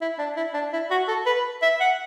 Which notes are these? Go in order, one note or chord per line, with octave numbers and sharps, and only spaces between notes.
E4
D4
E4
D4
E4
F#4
A4
B4
E5
F#5